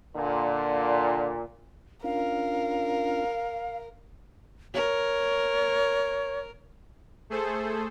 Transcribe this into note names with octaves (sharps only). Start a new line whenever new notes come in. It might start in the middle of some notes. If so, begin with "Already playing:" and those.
A#2 D3
C#4 D4 F4 A#4 F5
A#4 C#5
A3 G#4 A4 C5